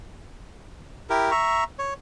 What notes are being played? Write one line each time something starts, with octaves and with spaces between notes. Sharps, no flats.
E4 G4 A#4
E5 A#5 C#6
C#5